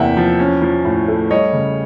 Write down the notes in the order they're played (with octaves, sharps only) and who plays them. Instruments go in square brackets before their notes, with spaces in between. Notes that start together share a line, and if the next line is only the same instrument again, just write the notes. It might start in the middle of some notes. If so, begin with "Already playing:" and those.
Already playing: [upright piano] E2 C3 A#3 E5 F#5 G5
F3
C#4
F3
A2
A3
G3 C#5 D#5
C#3